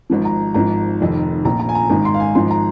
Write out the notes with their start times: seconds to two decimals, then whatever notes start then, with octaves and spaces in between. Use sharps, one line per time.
0.10 G#1 G#2 F3
0.25 A#5
0.54 G#1 G#2 F3 A#5
1.01 F1 F2 D#3
1.45 A#1 A#2 F3 A#5
1.60 A#5
1.69 G#5
1.75 A#5
1.90 G#1 G#2 D#3 A#5
2.05 C6
2.14 F5
2.20 G#5
2.35 G#1 G#2 F3 C6
2.51 A#5